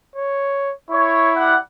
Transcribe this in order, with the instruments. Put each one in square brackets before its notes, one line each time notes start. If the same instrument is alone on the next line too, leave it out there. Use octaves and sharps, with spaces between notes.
[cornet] C#5
[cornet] E4 [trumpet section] C#5
[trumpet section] G3 F#5